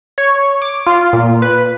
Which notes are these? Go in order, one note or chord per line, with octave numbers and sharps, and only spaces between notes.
C#5
D6
F4
A#2
B4